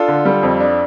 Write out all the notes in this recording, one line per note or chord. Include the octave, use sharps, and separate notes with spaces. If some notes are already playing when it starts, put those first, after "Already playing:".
Already playing: D4 F4 A4
D3
G3
F2
D4